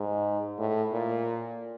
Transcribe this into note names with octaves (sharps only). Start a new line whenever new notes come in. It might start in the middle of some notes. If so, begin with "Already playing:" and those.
Already playing: G#2
A2
A#2